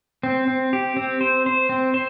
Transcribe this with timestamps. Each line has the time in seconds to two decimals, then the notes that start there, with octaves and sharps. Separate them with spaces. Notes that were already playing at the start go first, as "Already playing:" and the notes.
0.23 C4
0.48 C4
0.73 G4
0.97 C4
1.21 C5
1.46 C5
1.69 C4
1.94 C5